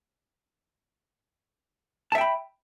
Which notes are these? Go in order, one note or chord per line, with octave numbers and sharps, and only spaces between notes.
E5 G5 A5 B5